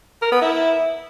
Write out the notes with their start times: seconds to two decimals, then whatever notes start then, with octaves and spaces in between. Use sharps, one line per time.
0.22 A#4
0.32 B3
0.42 E4